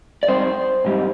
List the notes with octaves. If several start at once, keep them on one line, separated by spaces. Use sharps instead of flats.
D5
G#2 G3 C4 D#4 C5
G#2 G3 C4 D#4